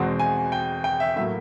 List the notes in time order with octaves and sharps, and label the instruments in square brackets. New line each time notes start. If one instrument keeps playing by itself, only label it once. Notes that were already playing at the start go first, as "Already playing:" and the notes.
Already playing: [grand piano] E2 B2 G#3 C4
G#5
G5
G5
E5
A2 F#3 A#3 E5